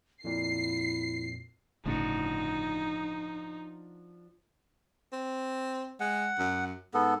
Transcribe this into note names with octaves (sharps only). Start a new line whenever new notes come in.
F2 A#2 E4 C7
G1 A2 C#3 F3 D4 D#4 F#4
C4
G#3 F#5
F#2
G#2 B3 A4